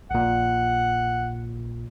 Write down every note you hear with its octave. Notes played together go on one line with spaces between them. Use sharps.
A#1 A#2 F#5